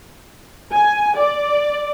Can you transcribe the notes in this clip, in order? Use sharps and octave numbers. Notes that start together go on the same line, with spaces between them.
G#5
D5